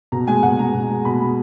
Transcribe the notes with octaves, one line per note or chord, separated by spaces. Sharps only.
B2 A#5
G#3 G#5
B2 F#5
G#3 A#5
B2
G#3
B2 B5
G#3